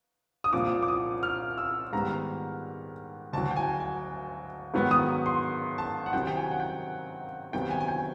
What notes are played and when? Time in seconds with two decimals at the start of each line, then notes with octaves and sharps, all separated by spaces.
0.44 D#6
0.53 C2 A#2 F3 D6
0.83 D6
0.88 D#6
1.23 F6
1.58 E6
1.93 G#2 D#3 G3 B3 A#5
3.33 D2 D3 F#3 A5
3.51 G5
3.56 G#5
3.80 G#5
4.74 G#2 D#3 F#3 B3
4.91 D#6
5.26 C6
5.78 A5
6.06 F#5
6.13 C3 D#3 F#3 G5
6.27 G5
6.36 G#5
6.51 F#5
6.60 G5
7.53 C3 D#3 F#3 B3 G5
7.70 G#5
7.81 G#5
7.88 G5